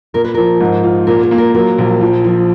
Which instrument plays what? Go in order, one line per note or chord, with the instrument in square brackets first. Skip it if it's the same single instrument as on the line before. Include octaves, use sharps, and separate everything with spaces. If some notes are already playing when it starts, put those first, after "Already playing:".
[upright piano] A#2 [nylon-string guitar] A#4
[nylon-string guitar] B4
[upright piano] F3 [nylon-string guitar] A#4
[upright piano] G#2
F4
[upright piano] A#2 [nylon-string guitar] A#4
[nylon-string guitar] G#4
[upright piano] A#3
[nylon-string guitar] A#4
[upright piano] F#3 [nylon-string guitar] A#4
[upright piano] A#1
F3
F3